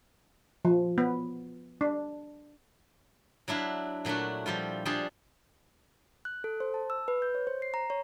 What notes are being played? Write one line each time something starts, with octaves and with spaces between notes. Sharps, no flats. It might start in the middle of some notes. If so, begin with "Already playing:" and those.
F3
B3
D4
F#3 D4 E4 E5 F5
A#2 F#3 A3 D4 F#4
F3 G3 E4 F4
F3 G3 D4 F4 G#4 A4
F#6
A4
C5
A5
E6
B4
G6
C#5
C5
C7
A#5
C#5